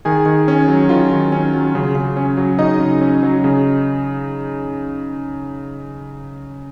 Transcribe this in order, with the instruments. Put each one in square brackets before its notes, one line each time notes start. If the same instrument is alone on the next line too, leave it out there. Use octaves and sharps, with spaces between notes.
[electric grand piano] D#3 G#4 G#5
D#3
C#4
F#3
D#3 F4 F5
D#3
C#4
F#3
C#3
C#3
C#4
F#3
C#3 D#4 D#5
C#3
C#4
F#3
C#3